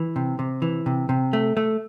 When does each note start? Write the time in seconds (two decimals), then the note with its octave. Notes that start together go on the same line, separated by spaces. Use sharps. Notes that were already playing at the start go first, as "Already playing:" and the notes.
Already playing: E3
0.16 C3
0.39 C3
0.62 E3
0.86 C3
1.09 C3
1.33 A3
1.57 A3